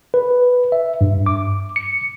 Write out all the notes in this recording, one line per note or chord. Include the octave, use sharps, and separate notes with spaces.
B4
E5
G2
D6
C#7